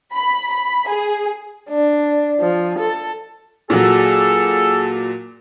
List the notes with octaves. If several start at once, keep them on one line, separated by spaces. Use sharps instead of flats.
B5
B5
G#4
D4
F3
A4
A#2 F#3 G#4 A4